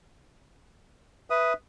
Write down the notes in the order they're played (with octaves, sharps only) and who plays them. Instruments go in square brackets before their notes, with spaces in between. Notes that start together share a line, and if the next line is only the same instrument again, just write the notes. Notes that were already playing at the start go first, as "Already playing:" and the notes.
[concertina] B4 D#6 [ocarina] E5